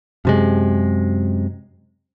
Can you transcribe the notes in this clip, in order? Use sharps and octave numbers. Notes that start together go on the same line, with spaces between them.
F#2 C3 G#3